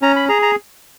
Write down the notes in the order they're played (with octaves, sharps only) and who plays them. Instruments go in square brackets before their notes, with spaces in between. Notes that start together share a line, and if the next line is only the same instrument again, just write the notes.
[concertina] C#4 A#5
B5
G#4 A#5
A#5